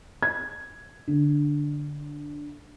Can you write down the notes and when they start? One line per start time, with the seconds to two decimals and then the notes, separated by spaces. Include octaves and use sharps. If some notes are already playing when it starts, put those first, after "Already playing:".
0.23 G#6
1.08 D3